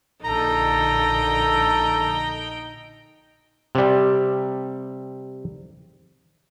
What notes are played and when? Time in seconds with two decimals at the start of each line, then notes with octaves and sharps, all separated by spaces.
0.24 A#1 D3 D#4 A4 G5 A#5
3.75 C3 G3